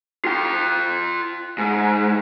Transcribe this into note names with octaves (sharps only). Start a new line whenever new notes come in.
F4 G5
G#2